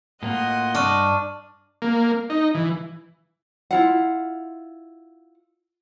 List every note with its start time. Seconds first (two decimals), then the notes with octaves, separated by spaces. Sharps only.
0.23 A2 A#3 F4 D#5 F#5 C6
0.75 G2 D4 C#6 F6 D#7
1.82 A#3
2.30 D#4
2.55 E3
3.71 E4 F4 F#5